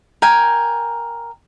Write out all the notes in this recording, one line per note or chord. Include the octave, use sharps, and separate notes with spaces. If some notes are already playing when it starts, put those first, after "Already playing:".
A#4 G5 G#5